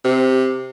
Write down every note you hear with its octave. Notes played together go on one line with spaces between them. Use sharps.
C3